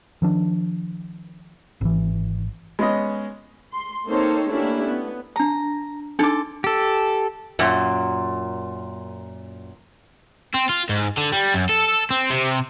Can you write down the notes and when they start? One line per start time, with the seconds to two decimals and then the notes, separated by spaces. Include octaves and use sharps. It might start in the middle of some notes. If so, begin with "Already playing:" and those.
0.22 D#3 F3 D4
1.81 G#1 E3
2.79 G#3 B3 C#4 D#5
3.72 C6
4.07 A#3 C4 D#4 A4 C5 C#5
4.49 A3 A#3 C#4 D4 E4 G4
4.84 B3
5.36 D4 A5 A#5
6.19 D4 D#4 A4 C6 D6
6.64 G4 A4
7.59 F#2 A#2
10.54 C4
10.69 F4
10.89 G#2
11.17 D3
11.32 G3
11.54 F#2
11.69 A4
12.10 C4
12.30 C3